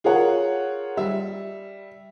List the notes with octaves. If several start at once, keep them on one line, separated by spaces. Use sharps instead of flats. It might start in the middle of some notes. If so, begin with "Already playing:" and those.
F4 G#4 A#4 C#5 F#5
G3 E5